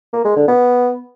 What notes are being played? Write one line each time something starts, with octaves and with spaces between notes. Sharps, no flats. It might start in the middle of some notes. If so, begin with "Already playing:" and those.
A#3
G#3
D3
B3